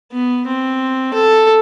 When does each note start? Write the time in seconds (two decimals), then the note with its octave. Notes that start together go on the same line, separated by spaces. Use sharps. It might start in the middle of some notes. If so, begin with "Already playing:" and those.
0.13 B3
0.47 C4
1.14 A4